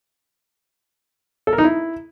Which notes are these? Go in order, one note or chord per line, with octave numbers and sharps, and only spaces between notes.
A4
A#4
D#4
E4